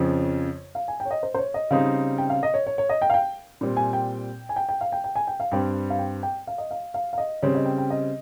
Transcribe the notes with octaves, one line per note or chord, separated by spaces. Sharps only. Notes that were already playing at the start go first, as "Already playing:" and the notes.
Already playing: F2 C#3 F3 C#5
F5
G#5
G5
C#5
D#5
C5
C5
C#5
D#5
C#3 G3 C4 D#4 F5
G5
F5
D#5
C#5
C#5
C#5
D#5
G5
F5
G5
A#2 G3 C4
G#5
G5
G#5
G5
G5
F5
G5
G5
G#5
G5
F5
G2 G3 C4 G5
F5
G5
G5
F5
D#5
F5
F5
F5
D#5
C#3 G3 C4 C#5
D#5
G5
G5
D#5